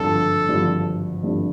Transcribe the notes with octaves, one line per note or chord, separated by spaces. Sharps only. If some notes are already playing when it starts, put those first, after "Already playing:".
Already playing: G#1 G2 D3 F3 A4
G#1 G2 D3 F3
G#1 G2 D3 F3